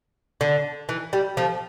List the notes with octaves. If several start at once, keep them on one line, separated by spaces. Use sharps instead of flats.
D3
E3
G3
F3 A3